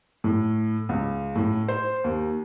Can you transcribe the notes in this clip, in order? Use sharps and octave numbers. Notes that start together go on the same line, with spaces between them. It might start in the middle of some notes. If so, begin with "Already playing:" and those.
A2
C#2
A2
C5
D#2